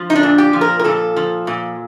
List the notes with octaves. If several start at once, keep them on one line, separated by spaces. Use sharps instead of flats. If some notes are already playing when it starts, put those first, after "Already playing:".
Already playing: F3
D#4
D4
A#2
G4
F3
A#4
A#4
A#2 A4
F3
A#2